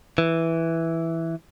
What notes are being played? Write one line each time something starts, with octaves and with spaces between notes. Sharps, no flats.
E3